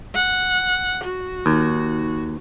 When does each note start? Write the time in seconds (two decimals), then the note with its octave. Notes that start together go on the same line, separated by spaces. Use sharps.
0.15 F#5
1.04 F#4
1.46 D#2